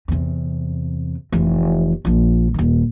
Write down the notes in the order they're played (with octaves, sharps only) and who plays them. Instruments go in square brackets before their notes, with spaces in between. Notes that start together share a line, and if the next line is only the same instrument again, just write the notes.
[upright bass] E2 C3
F1 E3
A#1 F3
D#1 D#3